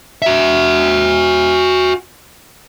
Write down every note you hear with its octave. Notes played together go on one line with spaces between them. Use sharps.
F#4 E5